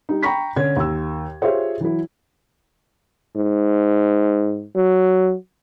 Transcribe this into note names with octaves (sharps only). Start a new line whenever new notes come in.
G3 D#4
G5 A#5 B5 C#6 A#6 B6
D3 C#4 G#6
D#2 E6
F4 G4 G#4 C5 C#5 E5
E3 F#3 E4
G#2
F#3